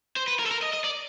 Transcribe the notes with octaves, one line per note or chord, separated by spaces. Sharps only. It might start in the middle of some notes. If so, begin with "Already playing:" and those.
C5
B4
A#4
A4
A#4
D#5
D#5
D5